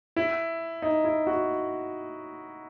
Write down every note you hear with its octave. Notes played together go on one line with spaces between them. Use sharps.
E4
D#4
E4
F#4